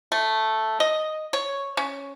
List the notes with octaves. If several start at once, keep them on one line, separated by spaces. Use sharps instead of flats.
A3
D#5
C#5
C#4